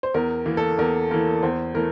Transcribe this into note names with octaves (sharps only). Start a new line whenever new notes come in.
C5
E2 A#4
E3 A#3
A4
E2 A#4
E3 A#3 A#4
E2 C5
E3 A3 A#4